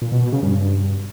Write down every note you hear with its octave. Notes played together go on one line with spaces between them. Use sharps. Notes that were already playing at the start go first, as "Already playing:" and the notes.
A#2
B2
B2
C#3
G2